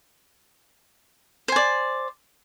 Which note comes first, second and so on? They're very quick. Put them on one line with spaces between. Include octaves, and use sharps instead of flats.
C5 G#5 D5